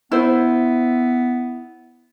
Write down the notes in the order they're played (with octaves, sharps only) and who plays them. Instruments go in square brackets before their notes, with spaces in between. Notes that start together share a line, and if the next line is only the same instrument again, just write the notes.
[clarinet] B3 [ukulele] E4 C5